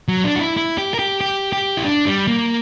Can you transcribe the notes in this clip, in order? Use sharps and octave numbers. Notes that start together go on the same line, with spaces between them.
F#3
D4
F#4
E4
E4
G4
A#4
G4
G4
G4
E4
D4
G3
A#3